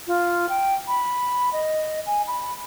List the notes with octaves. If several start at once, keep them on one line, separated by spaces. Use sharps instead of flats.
F4
G5
B5
D#5
G#5
B5